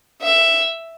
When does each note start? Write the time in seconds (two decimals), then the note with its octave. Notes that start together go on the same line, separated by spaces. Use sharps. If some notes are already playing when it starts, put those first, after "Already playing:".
0.22 E5